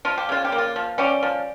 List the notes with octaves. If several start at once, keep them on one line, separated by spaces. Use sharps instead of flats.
F3 F4
G4
C#3 F4
G4
A#3
F4
F3
G3 C#4 G4
F3